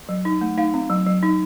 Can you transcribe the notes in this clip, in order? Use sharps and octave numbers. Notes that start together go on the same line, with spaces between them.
F#3
D#4
A3
D#4 F5
C4
F#3
F#3
D#4